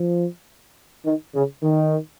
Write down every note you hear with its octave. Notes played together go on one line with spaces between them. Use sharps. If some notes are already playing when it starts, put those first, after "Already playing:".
Already playing: F3
D#3
C#3
D#3